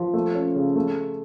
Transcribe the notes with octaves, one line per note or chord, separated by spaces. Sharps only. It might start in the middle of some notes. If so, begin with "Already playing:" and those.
Already playing: F3
A3
C#4
C#3
A3